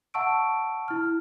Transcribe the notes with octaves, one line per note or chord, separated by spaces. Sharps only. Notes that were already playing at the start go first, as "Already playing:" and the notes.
E5 F#5 A5 C#6 E6 D7
E4 F6